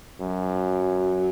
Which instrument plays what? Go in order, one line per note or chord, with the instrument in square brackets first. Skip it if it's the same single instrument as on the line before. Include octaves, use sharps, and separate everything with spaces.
[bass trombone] F#2 [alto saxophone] F#3